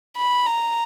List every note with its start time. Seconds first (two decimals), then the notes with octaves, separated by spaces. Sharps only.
0.17 B5
0.46 A#5